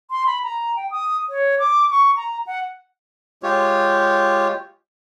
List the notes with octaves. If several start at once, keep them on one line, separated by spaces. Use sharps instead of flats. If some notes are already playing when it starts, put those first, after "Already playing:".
C6
B5
A#5
G5
D#6
C#5
D6
C#6
A#5
F#5
G#3 F4 G4 C#5